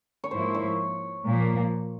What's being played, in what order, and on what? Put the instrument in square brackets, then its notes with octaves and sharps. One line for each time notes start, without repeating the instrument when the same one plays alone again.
[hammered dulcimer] C#5
[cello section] G#2 F3 A#3 E4 [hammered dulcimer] C5
[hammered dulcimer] C#5
[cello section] A#2 F3 A#3